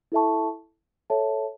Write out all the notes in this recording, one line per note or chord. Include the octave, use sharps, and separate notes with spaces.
E4 A4 E5 A5 C#6
A4 C#5 E5 A5